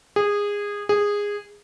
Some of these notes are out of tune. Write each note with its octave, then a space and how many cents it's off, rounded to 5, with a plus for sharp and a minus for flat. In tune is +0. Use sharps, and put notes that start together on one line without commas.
G#4 -20
G#4 -15